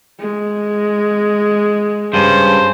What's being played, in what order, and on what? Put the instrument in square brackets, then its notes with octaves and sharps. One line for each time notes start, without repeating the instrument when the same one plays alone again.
[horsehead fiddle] G#3
[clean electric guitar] G2 C#3 [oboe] C5